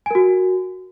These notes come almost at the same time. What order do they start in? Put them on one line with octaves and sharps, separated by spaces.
G#5 A#4 F#4